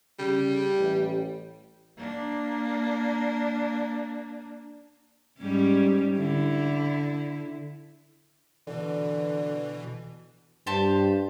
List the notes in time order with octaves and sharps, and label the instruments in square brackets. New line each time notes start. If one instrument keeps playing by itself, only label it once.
[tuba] C#3 [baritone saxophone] G3
[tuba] A1
[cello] A#3 D4
[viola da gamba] G#2 G3 C#4
D3 E4
[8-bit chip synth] B2 E3 [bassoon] D3
[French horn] G2 [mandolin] G4 C5 A5